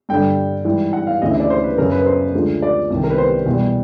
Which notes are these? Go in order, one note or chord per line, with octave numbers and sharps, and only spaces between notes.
G2 D3 G3 G5
G#2 E3 G3
F#5
F5
D2 C#3 E3 D#5
E5
D5
C5
B4
F#2 C#3 F#3 A#4
B4
C5
D2 D3 F3 G#3
D5
C2 C3 D#3
A#4
B4
C5
E2 B2 G3